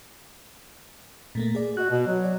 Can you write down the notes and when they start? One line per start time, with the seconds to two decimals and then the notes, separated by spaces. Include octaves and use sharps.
1.35 A#2 A3 A#3
1.55 G#4 D5
1.77 F#4 D#5 F#6
1.90 B2
2.07 F#3
2.24 D5